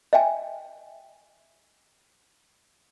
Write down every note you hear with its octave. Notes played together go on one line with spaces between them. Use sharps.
D#5 E5 G5 G#5